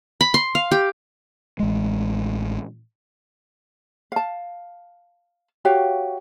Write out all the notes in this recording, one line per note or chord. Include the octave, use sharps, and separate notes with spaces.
B5
C6
F5
G4
A1 G#3
F5 A5
F#4 G4 C#5 F5